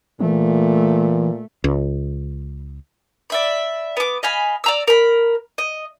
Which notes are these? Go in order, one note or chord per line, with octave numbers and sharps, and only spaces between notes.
A#2 E3 A3
C#2
D5 E5 B5
B3 D6
D#5 F5 G#5 B5
D5 A#5 E6
A#4 B5
D#5